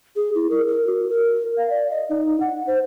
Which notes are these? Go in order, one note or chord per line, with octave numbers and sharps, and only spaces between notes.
G#4
E4
A#4
A#4
F#4
A#4
F5
D5
D#5
D#4
F#5
C5